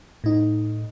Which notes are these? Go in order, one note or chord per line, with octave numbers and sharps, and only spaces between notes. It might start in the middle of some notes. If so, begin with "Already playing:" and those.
A2 D#4